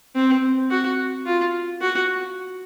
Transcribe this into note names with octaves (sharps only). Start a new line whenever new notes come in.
C4
F#4
F4
F#4